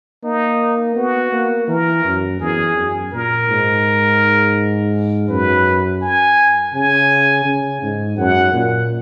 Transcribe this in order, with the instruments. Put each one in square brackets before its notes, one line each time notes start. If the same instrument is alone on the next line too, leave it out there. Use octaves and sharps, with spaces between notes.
[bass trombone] A#3 [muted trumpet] D#4
[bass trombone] B3 [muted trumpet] F#4
[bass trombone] A#3
[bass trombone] E3 [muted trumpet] A#4
[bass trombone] F#2
[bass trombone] E2 [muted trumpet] G#4
[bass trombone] F#2
[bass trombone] A#2 [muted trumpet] A#4
[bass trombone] G#2
[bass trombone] F#2 [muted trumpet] B4
[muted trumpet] G#5
[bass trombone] C#3 [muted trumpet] G#5
[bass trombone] C#3
G#2
[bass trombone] F#2 [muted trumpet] F#5
[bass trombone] A#2